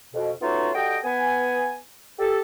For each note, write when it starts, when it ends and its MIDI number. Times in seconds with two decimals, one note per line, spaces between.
0.14 0.31 41
0.14 0.31 47
0.41 0.70 57
0.41 0.70 59
0.41 0.70 61
0.41 0.70 63
0.41 0.70 65
0.41 0.70 66
0.75 0.98 55
0.75 0.98 66
0.75 0.98 69
0.75 0.98 75
0.75 0.98 79
1.04 1.76 59
1.04 1.76 80
2.19 2.41 67
2.19 2.41 69